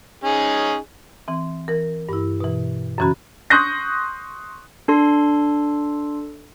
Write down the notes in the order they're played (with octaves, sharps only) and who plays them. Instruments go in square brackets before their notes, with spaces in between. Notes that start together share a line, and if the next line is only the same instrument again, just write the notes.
[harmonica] C#4 D#4 G#4
[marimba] E3 C4
E3 A#4
G2 E4
B2 E3
F#2 C#3 E3 C#4 F#4 B5
[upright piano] C6 C#6 D#6 F#6 G6 A#6
[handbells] D4 A4 C6